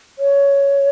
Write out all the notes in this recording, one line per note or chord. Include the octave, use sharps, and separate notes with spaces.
C#5